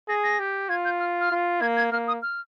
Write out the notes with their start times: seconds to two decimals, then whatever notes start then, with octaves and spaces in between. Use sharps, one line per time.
0.08 G#4 A#6
0.24 A#6
0.39 G4
0.69 F4 G#6
0.85 G6
1.00 F6
1.21 F6
1.31 F4
1.61 A#3 G#6
1.77 G#6
1.92 A#3 F6
2.08 D#6
2.22 F6